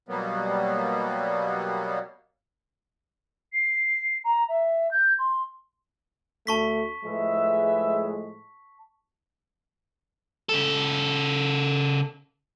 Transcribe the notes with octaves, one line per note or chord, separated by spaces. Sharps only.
B2 F#3 G3 A#3 B3
C7
A#5
E5
G6
C6
D2 A3 A5 C#6 B6
A2 F3 G#3 B4 E5
C#3 A4